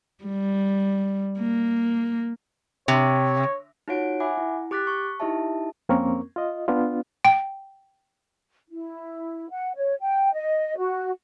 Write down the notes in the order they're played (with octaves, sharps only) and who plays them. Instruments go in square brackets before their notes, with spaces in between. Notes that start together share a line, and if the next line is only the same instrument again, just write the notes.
[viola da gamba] G3
A#3
[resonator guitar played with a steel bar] C3 [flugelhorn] C#5
[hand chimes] D#4 F4 F#4 C#5 F#5 D7
E5 F#5 G#5 B5 D6
E4
G4 D6 F#6 A6 B6
C#6
D#4 E4 G4 D#5 E5 A5
[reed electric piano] F2 A#3 C4 C#4 A#4 C#6
F4 D#5
B3 D4 F4
[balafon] G5
[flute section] E4
F#5
C#5
G5
D#5
F#4